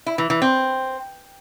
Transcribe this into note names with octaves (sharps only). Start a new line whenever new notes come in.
E4
E3
E3
C4